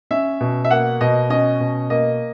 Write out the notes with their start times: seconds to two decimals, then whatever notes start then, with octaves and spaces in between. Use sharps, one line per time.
0.11 C#4 E5
0.41 B2
0.65 E5
0.71 A#3 F#5
1.01 B2 D#5
1.30 C#4 D#5
1.60 B2
1.90 A#3 D#5